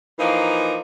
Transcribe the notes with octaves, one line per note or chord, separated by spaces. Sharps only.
E3 F3 A#3 D#4